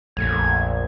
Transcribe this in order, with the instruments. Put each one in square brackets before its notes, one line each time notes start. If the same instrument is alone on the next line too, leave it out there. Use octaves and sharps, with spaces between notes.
[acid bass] A#1 [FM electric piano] F2 A3 [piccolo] G#6